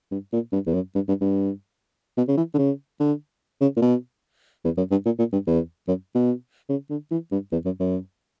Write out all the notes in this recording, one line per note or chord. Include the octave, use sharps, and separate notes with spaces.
G2
A#2
G2
E2
F#2
G2
G2
G2
B2
C#3
E3
D3
C#3
D3
C#3
A#2
B2
E2
F#2
G2
A#2
A#2
G2
E2
F#2
B2
C#3
D3
E3
G2
E2
F#2
F#2